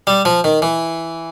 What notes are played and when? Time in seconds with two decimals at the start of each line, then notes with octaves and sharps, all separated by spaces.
0.07 G3
0.25 F3
0.44 D#3
0.62 E3